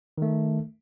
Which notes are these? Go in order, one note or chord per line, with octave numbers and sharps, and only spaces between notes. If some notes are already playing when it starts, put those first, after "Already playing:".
D#3 A3